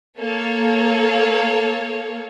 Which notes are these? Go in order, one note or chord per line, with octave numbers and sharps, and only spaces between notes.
A#3 A4 C#5